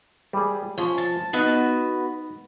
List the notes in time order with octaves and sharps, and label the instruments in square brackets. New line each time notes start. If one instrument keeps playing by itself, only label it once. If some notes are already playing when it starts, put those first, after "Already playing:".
[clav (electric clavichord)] G3 G#4
[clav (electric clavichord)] F3 [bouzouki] C#4
[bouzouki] A5
[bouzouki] B3 F#4 B4 [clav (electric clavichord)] D#4